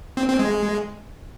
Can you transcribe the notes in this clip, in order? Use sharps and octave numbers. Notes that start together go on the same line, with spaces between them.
C4
C4
G#3